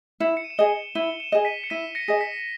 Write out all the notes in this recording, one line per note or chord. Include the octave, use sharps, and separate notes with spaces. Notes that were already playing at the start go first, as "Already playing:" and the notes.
E4 C#7 E7
C#7
D#7
E7
G#4 D#5 D#7 G7
E4 D#7 G7
C#7 E7
G#4 D#5
B6 D#7
C#7
E4 B6 D#7
A#6 C#7
G#4 D#5 A#6
B6